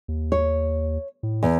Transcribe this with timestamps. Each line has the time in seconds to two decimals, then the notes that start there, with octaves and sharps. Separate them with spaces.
0.08 D#2
0.32 C#5
1.23 A2
1.43 E2